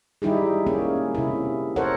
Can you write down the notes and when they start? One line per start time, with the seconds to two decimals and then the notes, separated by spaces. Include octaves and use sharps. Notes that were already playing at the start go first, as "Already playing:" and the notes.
0.22 G3 D#4 E4 G4 G#4
0.67 A#3 C#4 G#4
1.15 C3 E4
1.76 A4 A#4 C5 C#5 F#5